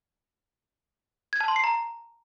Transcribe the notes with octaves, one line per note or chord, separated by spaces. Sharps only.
G#6
A5
C6
C7
A#5